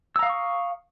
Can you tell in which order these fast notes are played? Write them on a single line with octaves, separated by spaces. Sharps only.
E6 A#5 F5 D#6 C#6